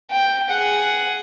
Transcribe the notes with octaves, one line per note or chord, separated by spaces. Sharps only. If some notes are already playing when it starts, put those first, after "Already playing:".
G5
G#4 F#5